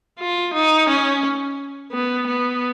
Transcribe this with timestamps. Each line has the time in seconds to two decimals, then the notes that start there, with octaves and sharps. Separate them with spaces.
0.19 F4
0.54 D#4
0.89 C#4
1.92 B3
2.27 B3